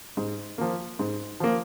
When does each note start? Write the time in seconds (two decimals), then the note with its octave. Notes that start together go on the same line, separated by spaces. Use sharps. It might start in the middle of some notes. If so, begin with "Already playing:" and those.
0.17 G#2
0.58 F3 A#3
0.99 G#2
1.40 F3 A#3